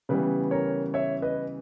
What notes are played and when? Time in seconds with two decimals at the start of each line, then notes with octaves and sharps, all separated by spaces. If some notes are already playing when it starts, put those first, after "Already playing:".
0.09 C#3 E3 G3 B3 B4
0.51 A#4 C#5
0.94 C#5 E5
1.22 B4 D#5